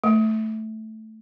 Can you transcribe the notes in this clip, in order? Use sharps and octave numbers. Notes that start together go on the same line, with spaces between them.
A3